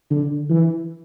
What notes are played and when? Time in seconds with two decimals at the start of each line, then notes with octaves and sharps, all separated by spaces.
0.11 D3
0.50 E3